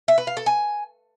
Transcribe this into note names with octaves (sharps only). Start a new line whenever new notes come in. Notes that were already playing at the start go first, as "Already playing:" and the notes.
E5
B4
F5
A4
G#5